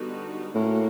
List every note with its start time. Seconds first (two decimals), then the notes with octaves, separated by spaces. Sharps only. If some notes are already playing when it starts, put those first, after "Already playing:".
Already playing: D3 G3 B3 D#4 F#4
0.55 A2 A#3 C#4 F#4 A#4